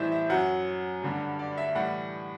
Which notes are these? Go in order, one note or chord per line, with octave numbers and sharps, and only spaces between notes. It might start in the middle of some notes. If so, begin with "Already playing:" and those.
Already playing: A2 E3 G3 C5 D5 E5
E5
F#2 F#3 F#5
G2 D3 G3
D5
E5
A2 E3 G3 F#5